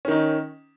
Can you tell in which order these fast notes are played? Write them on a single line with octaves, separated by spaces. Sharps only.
C#4 D#3 D#4